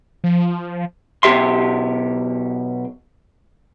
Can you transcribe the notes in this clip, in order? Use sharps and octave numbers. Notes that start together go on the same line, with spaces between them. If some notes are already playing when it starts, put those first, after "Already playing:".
F3
B1 B2 G#3 G4 E5 C6